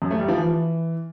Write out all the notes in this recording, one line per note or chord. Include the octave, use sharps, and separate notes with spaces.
F#2
A3
G3
F3
E3